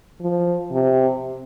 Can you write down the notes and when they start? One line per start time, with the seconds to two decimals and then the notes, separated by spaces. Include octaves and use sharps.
0.20 F3
0.72 C3